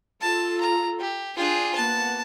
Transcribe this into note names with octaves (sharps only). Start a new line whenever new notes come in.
F4 A4 A5
A#5
G4
D4 F4 G#4 G5
A#3 B3 F#5 A5